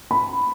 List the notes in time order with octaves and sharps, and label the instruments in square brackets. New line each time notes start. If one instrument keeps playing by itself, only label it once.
[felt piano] B5